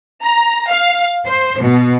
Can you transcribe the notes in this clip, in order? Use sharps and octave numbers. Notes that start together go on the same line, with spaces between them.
A#5
F5
C5
B2